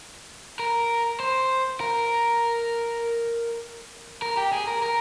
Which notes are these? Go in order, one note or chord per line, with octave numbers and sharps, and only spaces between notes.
A#4
C5
A#4
A#4
G4
G#4
A#4
A#4